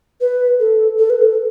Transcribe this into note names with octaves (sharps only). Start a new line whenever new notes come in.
B4
A4
A4
B4
A4